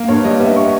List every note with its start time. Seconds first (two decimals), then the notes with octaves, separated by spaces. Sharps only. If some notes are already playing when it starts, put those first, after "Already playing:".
Already playing: A#3
0.08 G2 C#5
0.24 G3 D#5
0.40 B3 E5
0.56 C#6